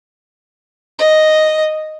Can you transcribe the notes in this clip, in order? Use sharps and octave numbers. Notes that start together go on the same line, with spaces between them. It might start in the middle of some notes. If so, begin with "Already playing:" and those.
D#5